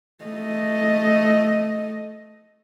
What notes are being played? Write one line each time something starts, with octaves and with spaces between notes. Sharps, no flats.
A3 D#5